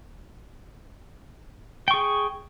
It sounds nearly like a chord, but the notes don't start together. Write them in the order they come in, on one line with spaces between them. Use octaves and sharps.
G5 C#6 G#4